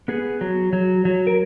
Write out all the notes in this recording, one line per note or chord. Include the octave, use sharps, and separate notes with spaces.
B3 G#4
F#3
F#3
F#3
A#4